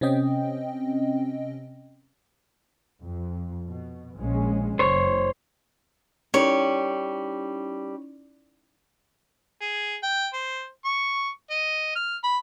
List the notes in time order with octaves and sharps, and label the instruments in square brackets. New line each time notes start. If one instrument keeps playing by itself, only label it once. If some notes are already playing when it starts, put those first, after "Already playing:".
[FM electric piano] C3 C4 C#4 D#5 G5
[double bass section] F2
B2
A#1 G#3 C#4
[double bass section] F#1 [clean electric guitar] C5 C#5
[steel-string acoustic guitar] G3 [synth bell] C#4 D#4 E4 [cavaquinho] C#5
[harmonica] G#4
G5
C5
C#6
D#5
F6
B5